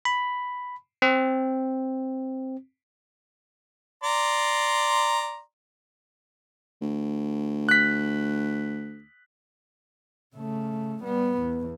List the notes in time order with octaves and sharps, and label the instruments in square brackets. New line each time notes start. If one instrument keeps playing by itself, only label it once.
[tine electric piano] B5
C4
[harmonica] D5 A#5 C6
[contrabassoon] D2
[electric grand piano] F#6 B6
[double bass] C#3 A3
G3 B3
E2